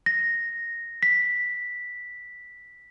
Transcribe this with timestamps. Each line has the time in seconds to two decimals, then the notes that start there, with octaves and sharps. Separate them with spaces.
0.06 A#6
1.03 B6